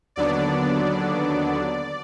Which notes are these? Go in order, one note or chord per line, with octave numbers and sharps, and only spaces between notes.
D#2 D3 F#3 B3 D4 D5